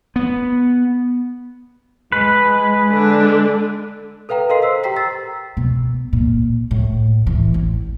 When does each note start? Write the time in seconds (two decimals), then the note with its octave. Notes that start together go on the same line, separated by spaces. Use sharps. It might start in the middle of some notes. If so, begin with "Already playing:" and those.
0.16 B3
2.12 G#3 B4
2.90 D3 D4
4.29 A4 B4 F5 G5 A#5
4.49 A4 A#4 D#5 F5 C6 C7
4.62 C5 E6 B6
4.83 G4 G5 A#5 B6 C7
4.97 E6 A6
5.57 B2
6.13 A#2
6.71 A2
7.27 E3
7.54 A1